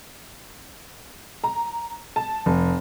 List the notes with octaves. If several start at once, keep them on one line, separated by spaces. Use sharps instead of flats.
A#5
A5
F1